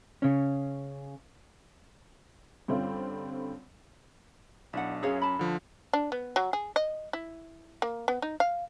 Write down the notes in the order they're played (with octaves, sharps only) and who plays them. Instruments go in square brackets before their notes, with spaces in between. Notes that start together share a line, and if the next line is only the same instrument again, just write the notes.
[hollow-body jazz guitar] C#3 C#4
[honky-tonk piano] G2 D3 C4 C#4 F4
[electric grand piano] B1 D4 [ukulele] E4 F#5
[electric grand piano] F#2 C#4 [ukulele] G#4 C#5 F5
[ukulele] A5 B5
[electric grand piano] D3 F3
[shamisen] D4
B3
F#3
G#4
D#5
E4
A#3
B3
D#4
F5